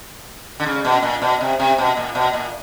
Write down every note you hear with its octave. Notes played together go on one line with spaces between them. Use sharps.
D3
C#3
B2
A#2
B2
C3
C3
B2
A#2
B2
A#2